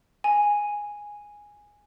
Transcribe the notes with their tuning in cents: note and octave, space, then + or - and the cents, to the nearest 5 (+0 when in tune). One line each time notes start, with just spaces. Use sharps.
G#5 -5